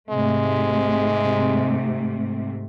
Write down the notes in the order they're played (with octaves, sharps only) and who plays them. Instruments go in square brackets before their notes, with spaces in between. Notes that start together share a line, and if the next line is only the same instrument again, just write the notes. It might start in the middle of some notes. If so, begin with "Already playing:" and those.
[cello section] G#2 C3 A3 [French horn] G#3